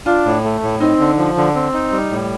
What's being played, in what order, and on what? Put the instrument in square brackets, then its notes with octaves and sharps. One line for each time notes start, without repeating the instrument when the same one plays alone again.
[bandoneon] D4 [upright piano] F4
[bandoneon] A2
A3
A2
[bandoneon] C4 [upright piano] D#4
[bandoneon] D3
F3
D3
C4
D#4
G3
A2